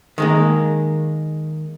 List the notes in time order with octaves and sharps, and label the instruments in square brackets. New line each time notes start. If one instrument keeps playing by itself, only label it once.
[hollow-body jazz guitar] D#3 G#3 A#3